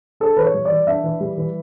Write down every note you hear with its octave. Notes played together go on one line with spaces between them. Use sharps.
D4 A4
E3 B4
C#5
G3
D5
E3
D4 E5
E3
G3
E3